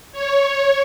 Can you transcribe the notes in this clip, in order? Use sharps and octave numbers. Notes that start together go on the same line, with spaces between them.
C#5